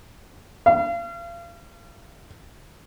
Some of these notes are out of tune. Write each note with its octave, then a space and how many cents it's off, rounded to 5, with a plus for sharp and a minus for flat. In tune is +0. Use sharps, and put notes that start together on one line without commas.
F5 -35